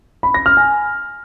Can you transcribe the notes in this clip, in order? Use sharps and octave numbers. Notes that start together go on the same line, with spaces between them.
B5
A#6
F6
G#5